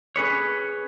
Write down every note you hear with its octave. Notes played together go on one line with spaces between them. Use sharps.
C#4 G#4 B4 C#5